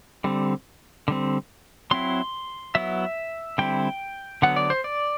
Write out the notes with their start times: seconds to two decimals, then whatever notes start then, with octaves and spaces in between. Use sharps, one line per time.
0.24 D3 G3 C4
1.08 D3 G3 C4
1.91 F#3 C4 E4 C6
2.75 F#3 B3 E4 E5
3.58 D3 G3 C4 E4 G5
4.42 D3 F#3 B3 F#5
4.56 D5
4.70 C5
4.84 D5